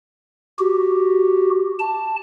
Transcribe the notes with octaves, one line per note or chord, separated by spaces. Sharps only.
F#4 G4
A5